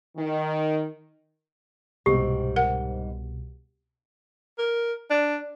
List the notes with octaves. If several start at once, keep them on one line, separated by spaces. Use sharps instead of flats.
D#3
C2 G#2 B2 G3 C4 G4
A#4 F#5
A#4
D4